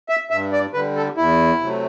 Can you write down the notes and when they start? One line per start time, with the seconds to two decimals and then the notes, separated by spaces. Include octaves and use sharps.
0.09 E5
0.30 G2 E5
0.53 D5
0.74 D3 G3 B4
0.96 A4
1.17 E2 E4
1.60 C3 F#3 A3